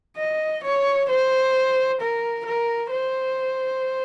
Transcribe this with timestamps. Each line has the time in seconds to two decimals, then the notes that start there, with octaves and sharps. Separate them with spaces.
0.17 D#5
0.63 C#5
1.09 C5
2.00 A#4
2.45 A#4
2.91 C5